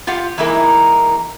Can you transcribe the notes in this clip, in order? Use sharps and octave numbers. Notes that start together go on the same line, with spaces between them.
F4 G4 F5 F#5
E3 G#3 A#3 D#4 E4 A#4